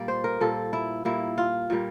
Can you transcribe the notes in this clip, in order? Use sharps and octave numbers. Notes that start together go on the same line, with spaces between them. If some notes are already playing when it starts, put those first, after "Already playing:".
Already playing: A#2 G3 A#3 D5
C5
A#4
A#2 G3 A#3 A4
E4
A#2 G3 A#3 E4
F4
A#2 G3 A#3